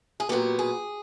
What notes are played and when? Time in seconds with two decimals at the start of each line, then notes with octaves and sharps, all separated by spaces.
0.20 G#4
0.29 A#2 F#3 B3 G4
0.59 G#4